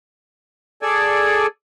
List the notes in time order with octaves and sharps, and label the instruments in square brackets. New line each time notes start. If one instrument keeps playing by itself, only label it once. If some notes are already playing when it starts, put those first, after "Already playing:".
[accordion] G#4 A4 D5 G#5